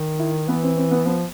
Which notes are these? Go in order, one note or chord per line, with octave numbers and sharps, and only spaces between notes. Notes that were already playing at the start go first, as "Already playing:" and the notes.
Already playing: D#3
E4
E3 B3
C4
C4
B3
F3 B3